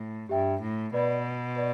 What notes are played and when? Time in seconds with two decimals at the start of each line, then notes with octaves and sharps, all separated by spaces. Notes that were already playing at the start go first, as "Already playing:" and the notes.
Already playing: A2
0.29 G2 G4 E5 G5
0.61 A2
0.93 B2 B4 D5 B5
1.56 B4 D5